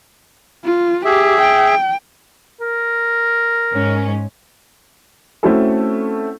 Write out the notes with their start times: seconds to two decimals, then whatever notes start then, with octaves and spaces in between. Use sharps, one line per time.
0.64 F4
1.05 G4 G#4 E5
1.41 G5
2.61 A#4
3.73 G#2 C#4
5.43 A3 C4 C#4 E4 F#4 A4